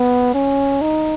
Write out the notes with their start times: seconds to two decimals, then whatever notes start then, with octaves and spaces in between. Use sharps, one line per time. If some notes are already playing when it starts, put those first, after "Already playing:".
Already playing: B3
0.34 C#4
0.81 D#4